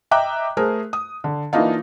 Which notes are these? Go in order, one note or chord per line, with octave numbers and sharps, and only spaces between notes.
D#5 E5 G5 A#5 D6 F#6
A3 G#4 A#4 C5
D#6
D3
E3 A#3 D4 D#4 F4